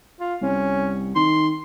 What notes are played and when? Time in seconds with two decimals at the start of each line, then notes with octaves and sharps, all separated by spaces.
0.20 F4
0.41 C2 C#4
1.16 D#3 C6